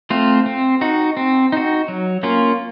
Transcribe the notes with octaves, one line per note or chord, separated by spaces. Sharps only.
A3 C4 F4
C4
D#4 F#4
C4
D#4 F#4
F#3
A#3 C#4 F4